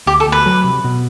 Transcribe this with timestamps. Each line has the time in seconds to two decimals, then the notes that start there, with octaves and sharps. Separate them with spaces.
0.06 D2 G4
0.20 A4
0.27 D2
0.32 B4
0.46 F#3
0.64 C3
0.84 B2